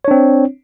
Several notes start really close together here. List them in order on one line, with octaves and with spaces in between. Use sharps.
C#5 D4 C4